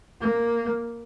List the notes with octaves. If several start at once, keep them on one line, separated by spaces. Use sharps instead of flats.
A#3